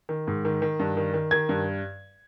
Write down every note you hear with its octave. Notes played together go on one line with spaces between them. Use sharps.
D#3
G#2
D#3
D#3
G2
D#3
D#3
D#3 G#6
G2